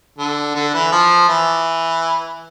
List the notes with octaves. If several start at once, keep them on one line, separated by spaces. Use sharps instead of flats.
D3
D3
E3
F3
E3